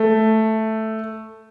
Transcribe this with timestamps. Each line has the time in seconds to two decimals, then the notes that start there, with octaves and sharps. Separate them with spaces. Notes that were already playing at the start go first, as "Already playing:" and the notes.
Already playing: A3